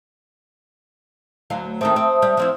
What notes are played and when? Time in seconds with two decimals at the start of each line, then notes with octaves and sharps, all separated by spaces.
1.50 D2 F#3 F5
1.81 D#3 A3 C4 E5 A5 D#6
1.96 C4
2.22 G3
2.37 F3 C4 E4